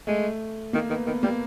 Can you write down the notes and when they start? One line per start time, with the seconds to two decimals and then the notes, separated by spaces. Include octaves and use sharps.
0.07 G#3 A3
0.73 D#3 A#3
0.90 D#3 B3
1.07 D#3 B3
1.23 G3 A#3